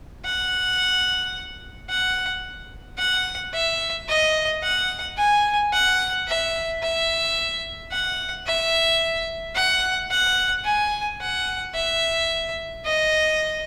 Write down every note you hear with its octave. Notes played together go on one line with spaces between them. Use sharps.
F#5
F#5
F#5
E5
D#5
F#5
G#5
F#5
E5
E5
F#5
E5
F#5
F#5
G#5
F#5
E5
D#5